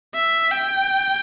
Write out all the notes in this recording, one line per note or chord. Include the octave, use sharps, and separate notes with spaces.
E5
G5